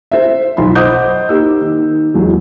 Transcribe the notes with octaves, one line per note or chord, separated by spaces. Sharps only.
C5 E5
B1 F3 B5 C6
C5 D#5 F#5 D6 D#6 G6
A#3 D#4 G4 E6
D#3
E2 F#3 G#3